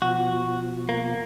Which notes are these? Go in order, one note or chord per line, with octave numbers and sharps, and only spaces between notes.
B2 F3 F#4
A#3